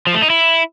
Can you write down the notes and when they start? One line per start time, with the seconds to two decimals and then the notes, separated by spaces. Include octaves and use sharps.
0.07 F3
0.14 A3
0.22 D#4
0.30 E4